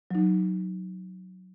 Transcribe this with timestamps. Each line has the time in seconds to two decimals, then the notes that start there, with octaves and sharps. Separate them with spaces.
0.11 F#3 D#4